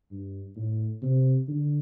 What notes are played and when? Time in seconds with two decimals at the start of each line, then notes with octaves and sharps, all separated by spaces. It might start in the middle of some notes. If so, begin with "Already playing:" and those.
0.11 G2
0.56 A2
1.02 C3
1.48 D3